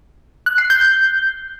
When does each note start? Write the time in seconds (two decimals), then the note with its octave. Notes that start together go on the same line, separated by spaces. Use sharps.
0.46 F#6
0.58 C7
0.70 G6